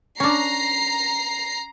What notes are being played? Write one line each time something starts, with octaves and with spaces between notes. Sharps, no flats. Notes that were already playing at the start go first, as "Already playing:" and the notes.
C#4 D4 A#5 C7